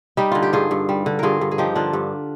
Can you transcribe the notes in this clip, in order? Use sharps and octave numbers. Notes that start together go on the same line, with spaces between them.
G3 D#4 G4
D3 F4
G4
G2 F4 G#4
G2
G3
D3
G2 F4 G#4 A#4
G2
G#4
F3 D#4 G4
D3 D4 F4
G2